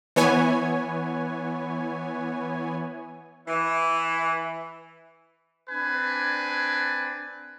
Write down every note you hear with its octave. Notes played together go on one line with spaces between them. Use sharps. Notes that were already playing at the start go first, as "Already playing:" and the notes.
E3 B3 C#5 G#5
E3
C4 D4 B4 G#5